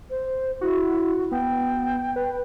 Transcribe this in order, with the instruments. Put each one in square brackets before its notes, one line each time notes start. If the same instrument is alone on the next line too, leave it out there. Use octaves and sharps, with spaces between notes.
[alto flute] C5
[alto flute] E4 [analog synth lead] F#4
[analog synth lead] B3 [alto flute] G5
[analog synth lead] B4